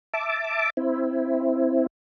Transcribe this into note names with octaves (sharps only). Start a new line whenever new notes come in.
E5 A5 D6
C4 E4